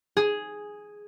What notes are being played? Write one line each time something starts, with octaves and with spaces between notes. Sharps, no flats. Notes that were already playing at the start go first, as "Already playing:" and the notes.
G#4